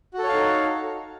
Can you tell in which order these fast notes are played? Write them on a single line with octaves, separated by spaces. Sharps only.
F#4 A4 C#5 F5 D#4